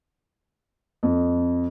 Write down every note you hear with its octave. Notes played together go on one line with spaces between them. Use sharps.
F2